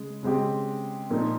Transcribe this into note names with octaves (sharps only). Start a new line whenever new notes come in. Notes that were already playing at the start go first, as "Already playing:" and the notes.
Already playing: C#3 G#3
C#3 G#3 C4 G4
A#2 F3 A#3 D#4